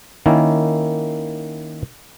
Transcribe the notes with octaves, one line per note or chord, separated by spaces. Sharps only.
D#3 A#3 C#4 E4